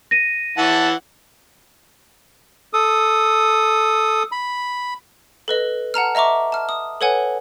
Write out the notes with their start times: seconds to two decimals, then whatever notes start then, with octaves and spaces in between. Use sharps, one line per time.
0.11 A#6 D#7
0.58 E3 C#5 E5 F#5 A5
2.73 A4 D#6
4.32 B5
5.48 A4 B4 D#5
5.94 F#5 A5 A#5 F6
6.15 D#5 E5 A#5 C#6 D6
6.52 A5 F6
6.69 D#6
7.01 A4 B4 C#5 F#5 G#5